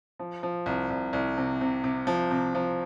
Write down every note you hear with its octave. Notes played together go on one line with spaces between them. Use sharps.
F3
F3
C2
C2
C2
C3
C3
C3
F3
C3
F3